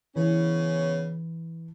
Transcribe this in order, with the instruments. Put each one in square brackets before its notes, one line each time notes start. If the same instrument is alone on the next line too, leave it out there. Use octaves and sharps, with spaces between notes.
[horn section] C#3 B3 C#4 [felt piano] E3